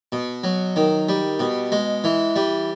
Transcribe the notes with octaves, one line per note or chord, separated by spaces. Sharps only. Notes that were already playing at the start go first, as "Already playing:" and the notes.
B2
F#3
D#3
G3
B2
G#3
E3
G3